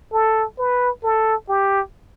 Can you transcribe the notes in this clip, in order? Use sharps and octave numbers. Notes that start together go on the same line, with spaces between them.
A4
B4
A4
G4